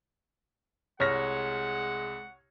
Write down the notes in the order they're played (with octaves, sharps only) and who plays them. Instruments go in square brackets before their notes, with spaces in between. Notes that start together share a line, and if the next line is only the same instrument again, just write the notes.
[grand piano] C2 F6 A#6 [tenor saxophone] G#3 [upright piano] C#5 [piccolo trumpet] F#5